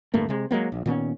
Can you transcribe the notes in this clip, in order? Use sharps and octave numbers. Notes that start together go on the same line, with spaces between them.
D1 G2 A3 A#3
C3 G#3
F#3 G#3 A#3 B3
A#1
A#2 D#3 B3 C#4